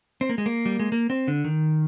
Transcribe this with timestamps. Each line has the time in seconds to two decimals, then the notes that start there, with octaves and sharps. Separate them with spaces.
0.21 C4
0.29 A#3
0.38 G#3
0.46 A#3
0.66 G3
0.80 G#3
0.92 A#3
1.10 C4
1.28 D3
1.45 D#3